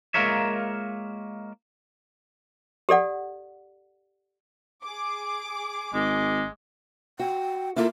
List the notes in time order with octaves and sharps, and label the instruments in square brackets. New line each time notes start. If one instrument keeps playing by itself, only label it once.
[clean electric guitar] G#3 A#3 F4 A#4 C#5 E5
[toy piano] G4 A4 D5 F#5
[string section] G#4 D6
[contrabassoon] G#1 [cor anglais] G#3
[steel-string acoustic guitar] F#4 [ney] G5
[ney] A#3 [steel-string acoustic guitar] E4 F4 A4